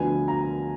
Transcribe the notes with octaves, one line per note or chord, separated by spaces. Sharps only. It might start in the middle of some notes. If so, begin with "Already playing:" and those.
Already playing: D2 D3 F3 B3 G#5
A#5